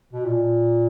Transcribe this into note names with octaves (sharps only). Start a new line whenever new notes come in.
B2
A#2